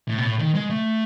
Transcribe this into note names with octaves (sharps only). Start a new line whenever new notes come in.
A2
B2
A2
D#3
G#3
A3